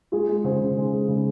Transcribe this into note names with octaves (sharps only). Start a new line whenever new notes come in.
G#3 F4 G#4
G#3
C#3 G#4 C5
C#3
G#3
G#3
C#3